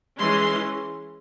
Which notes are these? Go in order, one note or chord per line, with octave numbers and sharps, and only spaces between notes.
E3 G#3 C#4 C6